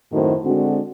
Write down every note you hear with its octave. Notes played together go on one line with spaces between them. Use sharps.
F#2 A2 D#3 C4 F#4 C5
D3 G#3 C4 D4 F#4